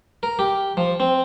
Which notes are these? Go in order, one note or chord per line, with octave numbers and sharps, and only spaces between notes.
A#4
G4
F3
C4